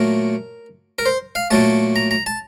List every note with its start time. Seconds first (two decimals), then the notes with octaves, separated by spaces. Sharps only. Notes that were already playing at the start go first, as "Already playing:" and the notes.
Already playing: A#2 F#3 A3 A#4
0.99 A#4
1.06 C5
1.35 F5
1.51 A#2 F#3 A3 A5
1.96 A#5
2.11 A#5
2.26 A5